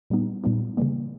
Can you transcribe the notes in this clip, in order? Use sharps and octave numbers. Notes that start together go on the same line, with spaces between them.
A#2 G3 B3 D#4
A#2 G3 B3 D#4
C#3 E3 G3 A#3